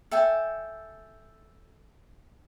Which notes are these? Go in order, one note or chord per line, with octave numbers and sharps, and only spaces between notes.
A4 E5 G5 G#5